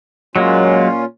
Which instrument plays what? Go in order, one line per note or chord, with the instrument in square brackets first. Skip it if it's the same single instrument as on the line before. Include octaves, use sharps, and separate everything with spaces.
[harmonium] A#2 C#4 F4 [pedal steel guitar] F#3 G#3 A#3